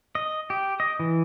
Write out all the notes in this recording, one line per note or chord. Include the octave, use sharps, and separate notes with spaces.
D#5
G4
D#5
E3